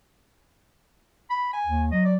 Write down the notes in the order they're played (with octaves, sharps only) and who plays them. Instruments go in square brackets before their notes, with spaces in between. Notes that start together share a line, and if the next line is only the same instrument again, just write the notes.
[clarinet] B5
G#5
[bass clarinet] D#2
[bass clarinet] F#3 [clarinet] D#5
[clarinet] D5